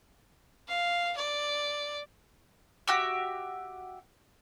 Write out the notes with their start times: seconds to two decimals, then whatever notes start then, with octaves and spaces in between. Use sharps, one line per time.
0.68 F5
1.16 D5
2.88 F#4 G4 E5